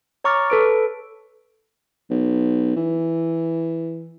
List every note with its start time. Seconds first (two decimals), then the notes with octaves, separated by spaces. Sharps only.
0.24 C#5 A#5 C#6 D6 F6 A6
0.50 A4 B4 D7
2.10 B1
2.76 E3